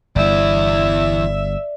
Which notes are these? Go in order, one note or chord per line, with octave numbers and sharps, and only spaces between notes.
G1 E2 G2 E4 D5 E5